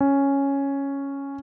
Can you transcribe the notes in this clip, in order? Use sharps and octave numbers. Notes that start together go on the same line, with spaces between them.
C#4